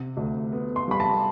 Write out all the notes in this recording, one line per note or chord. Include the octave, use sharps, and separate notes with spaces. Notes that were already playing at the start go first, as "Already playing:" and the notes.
Already playing: C3
D2
B3
C6
G3 B5
A5